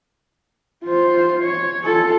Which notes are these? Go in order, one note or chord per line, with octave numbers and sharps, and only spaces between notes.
F4 C5
C#5
F4 A4